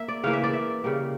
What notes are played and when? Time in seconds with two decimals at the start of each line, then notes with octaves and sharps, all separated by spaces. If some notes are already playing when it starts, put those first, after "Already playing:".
Already playing: A#3 E5
0.08 D5
0.23 C#3 E3 A#3 F5
0.33 E5
0.43 D5
0.53 E5
0.84 C#3 G3 A#3